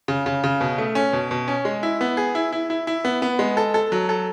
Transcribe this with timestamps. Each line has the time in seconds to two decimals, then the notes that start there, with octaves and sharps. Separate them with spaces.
0.08 C#3
0.26 C#3
0.44 C#3
0.61 B2
0.78 A3
0.95 C#4
1.13 B2
1.31 B2
1.48 C#4
1.65 G#3
1.83 E4
2.01 B3
2.17 G#4
2.35 E4
2.52 E4
2.70 E4
2.87 E4
3.05 B3
3.22 B3
3.39 G#3
3.57 A4
3.74 A4
3.92 F#3
4.09 A4